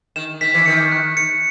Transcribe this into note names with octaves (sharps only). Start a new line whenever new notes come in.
D#3 E7
D#3 B6
E3
D#3 C#7
F#6
C#7